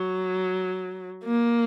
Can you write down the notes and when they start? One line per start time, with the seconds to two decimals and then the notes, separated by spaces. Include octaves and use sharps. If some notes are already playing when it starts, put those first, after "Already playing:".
Already playing: F#3
1.24 A#3